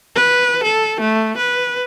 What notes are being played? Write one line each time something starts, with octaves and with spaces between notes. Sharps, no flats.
B4
A4
A3
B4